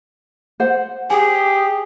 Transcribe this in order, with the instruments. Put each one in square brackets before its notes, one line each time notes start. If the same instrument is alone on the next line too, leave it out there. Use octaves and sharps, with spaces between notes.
[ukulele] C5 F#5
[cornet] G4 [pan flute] G#4 [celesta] G#5